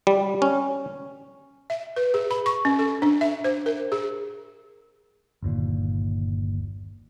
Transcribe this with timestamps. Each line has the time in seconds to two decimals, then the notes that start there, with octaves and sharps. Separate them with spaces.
0.07 G3
0.42 C#4
1.70 E5
1.96 B4
2.14 G#4
2.31 B5
2.46 C#6
2.65 C#4
2.79 A4
3.02 D4
3.21 E5
3.44 C5
3.66 A#4
3.92 G#4
5.42 G1 D#2 A#2